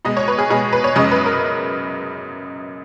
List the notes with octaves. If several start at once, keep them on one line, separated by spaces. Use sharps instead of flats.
B2 G#3 D#5
C#5
B4
G#4
B2 G#3 G#4
B4
C#5
F#2 C#3 G#3 D#5
B4
A#4